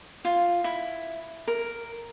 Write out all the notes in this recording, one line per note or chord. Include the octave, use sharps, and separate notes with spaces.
F4
E4
A#4